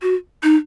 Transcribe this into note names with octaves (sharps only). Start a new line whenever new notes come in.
F#4
D#4